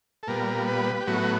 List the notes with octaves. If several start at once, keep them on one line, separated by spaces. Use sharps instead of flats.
A4
A#2 G3 B3 A#4
B4
G4
A2 F#3 B3 F#4